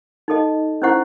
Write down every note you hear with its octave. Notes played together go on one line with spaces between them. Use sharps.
D#4 A4 D#5
C#4 E4 C5 F#5 C#6